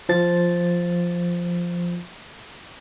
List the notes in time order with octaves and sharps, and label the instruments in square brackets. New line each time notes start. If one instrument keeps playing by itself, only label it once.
[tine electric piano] F3 A6